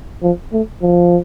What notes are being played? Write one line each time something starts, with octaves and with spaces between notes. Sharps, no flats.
F3
A3
F3